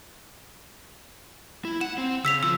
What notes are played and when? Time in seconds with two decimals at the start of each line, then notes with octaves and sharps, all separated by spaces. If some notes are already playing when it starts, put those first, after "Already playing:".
1.65 E4
1.81 F#5 E7
1.98 C4
2.25 C#3 E6 B6 F7
2.43 F3 F4 E6